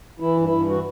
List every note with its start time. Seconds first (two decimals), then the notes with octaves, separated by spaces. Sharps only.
0.20 E3 E4
0.37 G2
0.44 E4
0.52 G2
0.68 E3 F#4